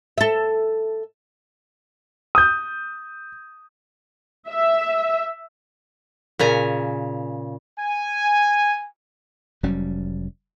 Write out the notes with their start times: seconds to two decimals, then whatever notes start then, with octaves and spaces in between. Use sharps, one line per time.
0.18 A4 E5
2.35 D#6 G6
4.48 E5
6.39 A#2 C#3 G#5 A#5
7.79 G#5
9.63 F1 F#3 G3 C#4